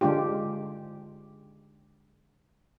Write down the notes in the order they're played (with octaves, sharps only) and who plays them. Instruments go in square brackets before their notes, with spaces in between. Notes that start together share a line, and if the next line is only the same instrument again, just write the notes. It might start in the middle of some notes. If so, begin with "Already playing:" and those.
[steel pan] D3 G#3 D4 F4 G4